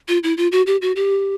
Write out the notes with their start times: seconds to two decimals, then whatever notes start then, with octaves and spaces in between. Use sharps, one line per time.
0.08 F4
0.23 E4
0.37 F4
0.52 F#4
0.67 G4
0.82 F#4
0.96 G4